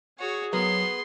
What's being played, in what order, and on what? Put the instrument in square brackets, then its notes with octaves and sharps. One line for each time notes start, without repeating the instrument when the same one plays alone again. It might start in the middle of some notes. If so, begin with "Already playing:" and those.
[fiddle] F#4 C#5 [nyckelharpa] G#4
[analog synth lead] F#3 [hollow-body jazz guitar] B3 A#4 [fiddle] C6